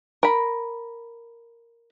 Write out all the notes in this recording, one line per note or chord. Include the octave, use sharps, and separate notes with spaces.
A#4 B5